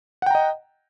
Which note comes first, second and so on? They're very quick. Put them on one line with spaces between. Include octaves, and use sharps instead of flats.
F#5 G5 A#5 D#5